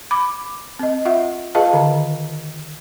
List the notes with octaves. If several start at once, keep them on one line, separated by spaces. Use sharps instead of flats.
B5 D6
C4 D#5
F4 E5 F#5
F4 G#4 B4 D#5 F5 A5
D3 D#3